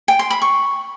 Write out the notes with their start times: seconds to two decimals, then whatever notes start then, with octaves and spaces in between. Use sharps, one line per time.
0.08 G5
0.19 C6
0.30 B5
0.42 C#6